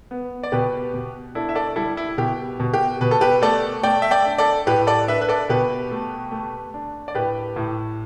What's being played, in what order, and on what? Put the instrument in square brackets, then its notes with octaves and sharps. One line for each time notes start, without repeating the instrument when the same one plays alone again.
[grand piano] B3
D5
B2 G4 B4
B2
D4 E4 A4
E5
A4 D5
G3 E4 A4
E4
B2 G4
B2
G4
B2 B4
A4
G4 B4
A3 A4 D5
A3 D5 G5
E5
D5 G5
D4
A4 D5
A2 G4 B4
A4 D5
D4 B4 E5
B4
A4 D5
B2 G4 B4
A3
A3
D4
D5
A2 G4 B4
A2